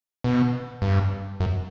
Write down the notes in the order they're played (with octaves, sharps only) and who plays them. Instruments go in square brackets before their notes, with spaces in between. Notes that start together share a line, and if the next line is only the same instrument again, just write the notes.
[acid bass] B2
G2
F#2